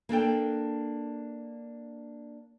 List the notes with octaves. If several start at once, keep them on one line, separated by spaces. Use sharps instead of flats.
A#3 D4 A4 G5